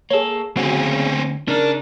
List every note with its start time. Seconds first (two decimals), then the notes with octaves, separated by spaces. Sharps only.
0.10 A#3 G#4 A4 C#5
0.57 D2 C#3 C4 C#4 F#4
1.48 C#3 D4 D#4 A#4 F6